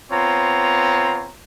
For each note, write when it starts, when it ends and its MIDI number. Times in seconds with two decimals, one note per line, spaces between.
0.11 1.31 59
0.11 1.31 60
0.11 1.31 65
0.11 1.31 73
0.11 1.31 82